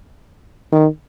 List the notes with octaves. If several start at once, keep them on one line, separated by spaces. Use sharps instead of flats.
D#3